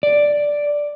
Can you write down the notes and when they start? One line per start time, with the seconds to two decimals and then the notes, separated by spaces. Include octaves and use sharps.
0.03 D5